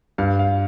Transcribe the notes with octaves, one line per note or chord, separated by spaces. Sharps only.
G2 F5
F5